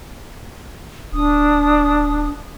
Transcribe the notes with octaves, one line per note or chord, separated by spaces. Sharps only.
D1 D4 D#6